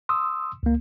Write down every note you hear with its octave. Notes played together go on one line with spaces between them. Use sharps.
C6 D#6 E6
C#2 A#3